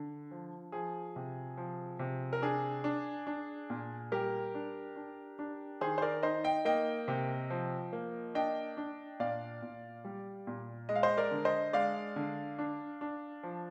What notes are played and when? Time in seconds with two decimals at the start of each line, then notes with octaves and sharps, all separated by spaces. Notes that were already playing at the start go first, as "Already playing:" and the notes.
Already playing: D3
0.31 F3
0.72 F3 G#4
1.16 C3
1.57 F3
1.99 C3
2.33 A#4
2.42 D4 G#4
2.84 D4
3.27 D4
3.70 A#2
4.12 G3 G4 A#4
4.55 D4
4.96 D4
5.39 D4
5.81 D#3 G#4 C5
5.98 C5
6.02 A#4 D5
6.23 D#4 C5 D#5
6.44 D#5 G5
6.65 A#3 D#5 G5
7.08 C3
7.50 F3
7.93 A#3
8.35 D4 D#5 G5
8.77 D4
9.20 A#2 D5 F5
9.62 A#2
10.05 G3
10.47 A#2
10.89 G#3 D#5
10.95 F5
11.03 C5 D#5
11.17 A#4 D5
11.31 D3
11.45 C5 D#5
11.73 G#3 D5 F5
12.16 D3
12.58 D4
13.01 D4
13.43 F3